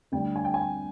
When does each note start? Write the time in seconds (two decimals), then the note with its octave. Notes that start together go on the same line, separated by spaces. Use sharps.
0.12 D2 D3 G3 G5
0.36 G#5
0.45 G5
0.54 G#5